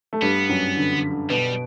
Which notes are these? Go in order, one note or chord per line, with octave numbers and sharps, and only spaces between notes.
A3
G2 G3 B3
F#2 F#3
D3
D3
D3
B2 G3 B3